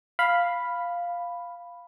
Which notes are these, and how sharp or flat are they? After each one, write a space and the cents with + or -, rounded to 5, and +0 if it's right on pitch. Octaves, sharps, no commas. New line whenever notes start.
F5 +0 B5 +0